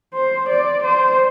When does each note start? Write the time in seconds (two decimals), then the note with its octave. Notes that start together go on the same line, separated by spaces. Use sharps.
0.14 C5
0.49 D5
0.84 C5